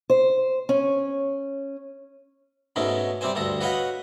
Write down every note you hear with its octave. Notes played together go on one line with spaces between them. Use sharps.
C5
C#4
G#2 B2 A3 C#4 D#4
C3 G3 C4 C5 G#5
D2 G2 A4 A#5
F#4 B4 C#5 D#5 F5 F#5